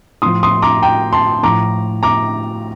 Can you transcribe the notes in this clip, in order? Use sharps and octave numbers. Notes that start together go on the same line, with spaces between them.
A2 F3 C6 D#6
C6 D#6
A#5 D6
G5 A#5
A5 C6
A2 F3 A#5 D6
A#5 D6